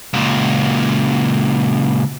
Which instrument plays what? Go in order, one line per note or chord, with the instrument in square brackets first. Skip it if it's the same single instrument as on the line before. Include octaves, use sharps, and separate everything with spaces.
[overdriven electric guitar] C#2 A#2